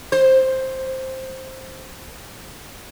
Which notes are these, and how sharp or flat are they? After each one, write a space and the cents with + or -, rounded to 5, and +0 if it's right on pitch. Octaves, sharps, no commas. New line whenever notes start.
C5 +5